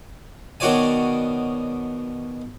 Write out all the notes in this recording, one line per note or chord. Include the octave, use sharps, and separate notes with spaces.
B2 D#3 F#4 C#5 D5 G#5